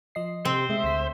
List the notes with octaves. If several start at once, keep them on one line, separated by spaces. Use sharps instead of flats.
F3 D#5 C7
C3 C4 C5
G#3 E5
D2 B6